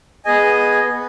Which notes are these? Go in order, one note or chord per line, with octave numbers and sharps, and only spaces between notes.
B3 G#4 D#5 G#5
B3